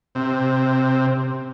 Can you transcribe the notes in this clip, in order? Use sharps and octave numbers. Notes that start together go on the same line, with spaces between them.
C3